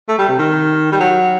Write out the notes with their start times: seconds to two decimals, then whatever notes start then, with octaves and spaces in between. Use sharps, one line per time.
0.09 A3
0.18 G3
0.29 C3
0.39 D#3
0.92 G3
1.00 F#3